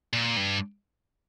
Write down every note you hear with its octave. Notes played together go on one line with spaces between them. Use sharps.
A#2
G2